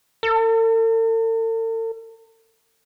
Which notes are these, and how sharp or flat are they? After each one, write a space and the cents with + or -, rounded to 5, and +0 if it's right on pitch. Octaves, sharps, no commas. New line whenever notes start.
A4 +45